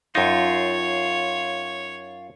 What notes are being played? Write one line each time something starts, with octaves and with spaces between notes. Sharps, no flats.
F#2 D#4 F4 C#5